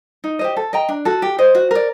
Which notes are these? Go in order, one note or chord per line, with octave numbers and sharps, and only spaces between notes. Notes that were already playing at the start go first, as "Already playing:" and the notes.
D#4
G4 C5 D#5
A4
D#5 G5 A#5
D4
F#4 A4
G4
C5 D#5
F#4
A#4 D5